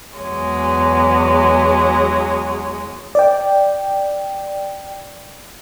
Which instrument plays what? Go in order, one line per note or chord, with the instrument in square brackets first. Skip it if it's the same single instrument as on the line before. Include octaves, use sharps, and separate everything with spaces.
[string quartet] E2 F#3 G#3 C#5
[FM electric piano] D5 G5